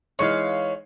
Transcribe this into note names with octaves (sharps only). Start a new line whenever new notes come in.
E3 G#3 D#4 C#5 F5